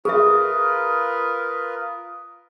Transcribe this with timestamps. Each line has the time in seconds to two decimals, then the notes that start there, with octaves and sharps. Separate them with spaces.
0.05 F4 G#4 A#4 B4 E5 D#6